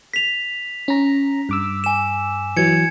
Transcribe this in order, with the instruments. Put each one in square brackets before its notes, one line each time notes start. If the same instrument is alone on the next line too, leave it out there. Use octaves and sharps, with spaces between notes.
[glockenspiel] B6 F7
[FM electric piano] C#4 A#5
G2 D6 E6
[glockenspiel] G#5 E7
[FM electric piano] E3 F#3 [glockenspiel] G#6 C#7